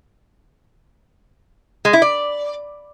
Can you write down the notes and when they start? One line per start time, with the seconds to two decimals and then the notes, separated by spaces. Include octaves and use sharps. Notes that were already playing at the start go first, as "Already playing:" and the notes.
1.85 G#3
1.93 E4
2.02 D5